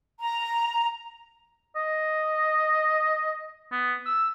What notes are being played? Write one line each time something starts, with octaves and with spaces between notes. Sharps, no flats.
A#5
D#5
B3
E6